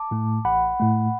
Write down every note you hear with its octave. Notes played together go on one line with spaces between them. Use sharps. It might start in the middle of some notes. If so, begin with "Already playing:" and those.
Already playing: A5 D6
A2 A3
A1 F#5 B5
A2 A3